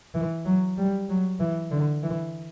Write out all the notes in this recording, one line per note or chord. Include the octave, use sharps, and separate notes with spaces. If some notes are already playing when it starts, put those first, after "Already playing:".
E3
F#3
G3
F#3
E3
D3
E3